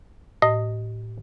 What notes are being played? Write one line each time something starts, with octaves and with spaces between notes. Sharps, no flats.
A2 D#5